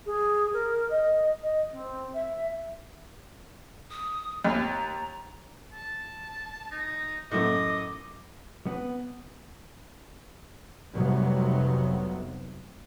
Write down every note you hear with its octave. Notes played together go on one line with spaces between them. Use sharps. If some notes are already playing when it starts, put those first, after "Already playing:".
G#4
A#4
D#5
D#5
C4
E5
D#6
D#2 A#5
A5
D#4
F#2 A2 D#5 D6
B3
F1 C3 F#3 G3 B3